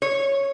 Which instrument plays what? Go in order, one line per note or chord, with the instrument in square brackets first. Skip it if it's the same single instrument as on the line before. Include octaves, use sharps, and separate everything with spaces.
[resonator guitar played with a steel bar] C#5